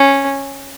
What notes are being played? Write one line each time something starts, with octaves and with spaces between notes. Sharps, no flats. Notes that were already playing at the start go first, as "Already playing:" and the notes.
Already playing: C#4